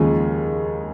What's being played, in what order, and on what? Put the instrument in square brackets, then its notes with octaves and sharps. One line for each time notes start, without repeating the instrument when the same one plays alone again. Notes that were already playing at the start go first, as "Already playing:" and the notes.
Already playing: [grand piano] D#2 C#3 F3 G#3 F4 G#4